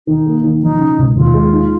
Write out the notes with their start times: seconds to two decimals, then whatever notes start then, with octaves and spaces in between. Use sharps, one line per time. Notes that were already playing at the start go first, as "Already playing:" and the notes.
0.07 D#3 D#4
0.26 A#3
0.44 D#3
0.62 F3 D#4
0.80 C#3
0.99 C#2
1.16 D#2 F4
1.34 G#3
1.53 D#4